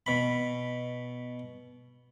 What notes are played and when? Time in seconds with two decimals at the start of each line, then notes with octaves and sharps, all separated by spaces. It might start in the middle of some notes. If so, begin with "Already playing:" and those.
0.06 B2 B5